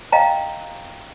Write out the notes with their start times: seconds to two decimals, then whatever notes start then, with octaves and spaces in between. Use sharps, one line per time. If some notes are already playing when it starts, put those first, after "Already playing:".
0.12 D#5 F5 G5 A#5